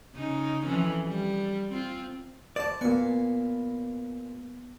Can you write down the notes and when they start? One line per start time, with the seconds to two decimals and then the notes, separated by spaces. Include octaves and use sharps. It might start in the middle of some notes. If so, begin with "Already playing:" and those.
0.16 C#3 D#4
0.66 F2 E3 C#4
1.09 G3
1.73 C4 F4
2.56 C5 D5 A5
2.81 A#2 B3 G#5